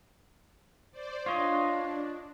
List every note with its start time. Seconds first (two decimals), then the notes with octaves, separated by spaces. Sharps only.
0.91 C5 D5
1.26 D4 F4 C#5 D#5